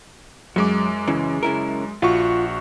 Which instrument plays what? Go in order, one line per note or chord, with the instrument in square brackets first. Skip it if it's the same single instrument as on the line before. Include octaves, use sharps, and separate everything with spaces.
[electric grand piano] F#2 G#3 D6 [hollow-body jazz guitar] F#3
[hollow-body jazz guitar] C#3 E3
C#3 E4 A#4
[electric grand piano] A#1 F#4 C#6 [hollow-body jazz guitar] F4